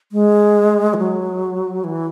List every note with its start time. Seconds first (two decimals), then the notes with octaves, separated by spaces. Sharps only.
0.12 G#3
0.94 E3
0.98 F#3
1.84 E3